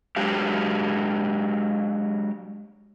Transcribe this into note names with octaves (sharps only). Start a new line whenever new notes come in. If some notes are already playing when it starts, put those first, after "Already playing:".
F#3 G#3 D4 G4 F5